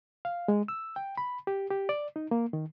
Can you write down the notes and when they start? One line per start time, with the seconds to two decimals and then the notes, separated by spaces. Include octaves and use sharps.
0.25 F5
0.48 G#3
0.68 E6
0.96 G5
1.17 B5
1.47 G4
1.70 G4
1.89 D5
2.16 D#4
2.31 A#3
2.53 D#3